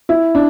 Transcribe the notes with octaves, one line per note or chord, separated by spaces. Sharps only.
E4
D4